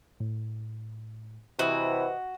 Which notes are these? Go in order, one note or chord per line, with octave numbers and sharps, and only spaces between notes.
A2
C3 E3 E4 F#4 D#5